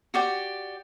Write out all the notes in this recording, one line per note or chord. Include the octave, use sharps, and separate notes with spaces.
F#4 G4 D5